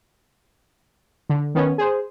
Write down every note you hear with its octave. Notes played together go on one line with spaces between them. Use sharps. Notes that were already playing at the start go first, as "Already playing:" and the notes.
D3
D#3 B3 C#4
G#4 C5